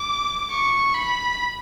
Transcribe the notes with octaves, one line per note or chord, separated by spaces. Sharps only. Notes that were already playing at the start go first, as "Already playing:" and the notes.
Already playing: D6
C#6
B5